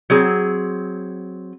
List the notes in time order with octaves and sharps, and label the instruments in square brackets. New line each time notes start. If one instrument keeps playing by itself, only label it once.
[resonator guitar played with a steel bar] F#3 C4 G#4